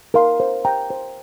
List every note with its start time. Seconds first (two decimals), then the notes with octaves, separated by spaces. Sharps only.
0.14 A#4 F5 C6
0.40 C5
0.65 G5 A#5
0.90 C5